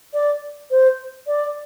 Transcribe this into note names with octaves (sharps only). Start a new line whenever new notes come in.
D5
C5
D5